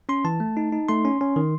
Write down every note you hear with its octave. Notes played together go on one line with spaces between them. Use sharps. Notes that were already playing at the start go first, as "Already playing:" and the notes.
C#4 C6
E3 A5
A3
D#4
D#4
A3 C6
C#4
C#4
D#3